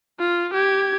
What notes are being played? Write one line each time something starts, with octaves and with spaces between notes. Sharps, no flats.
F4
G4 G#6